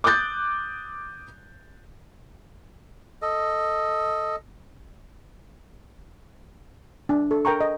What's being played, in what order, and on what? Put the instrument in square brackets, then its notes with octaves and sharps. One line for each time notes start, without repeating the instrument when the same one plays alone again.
[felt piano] D6 D#6 F#6 G6 A6
[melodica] A4 D#5
[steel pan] D4
A4
A#4 G5 A#5 C#6
D#5